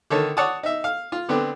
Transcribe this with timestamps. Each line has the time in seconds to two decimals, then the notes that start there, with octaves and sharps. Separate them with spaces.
0.10 D3 D#3 C#5 A5
0.37 C#5 D5 F#5 A5 D6 D#6
0.63 D#4 E5
0.84 F5
1.12 F4
1.29 D3 B3 C4 D4